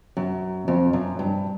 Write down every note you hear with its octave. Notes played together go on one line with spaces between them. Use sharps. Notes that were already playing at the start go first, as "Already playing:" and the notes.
F#2
F2
F#2
G2